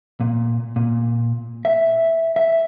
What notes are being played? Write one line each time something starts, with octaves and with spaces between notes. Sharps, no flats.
A#2
A#2
E5
E5